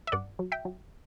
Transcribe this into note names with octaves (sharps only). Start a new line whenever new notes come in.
E5
G2 D5 F#5
F#3
E5 G5
F#3